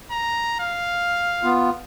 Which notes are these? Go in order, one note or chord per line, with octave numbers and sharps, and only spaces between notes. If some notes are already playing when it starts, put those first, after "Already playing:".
A#5
F5
B3 F4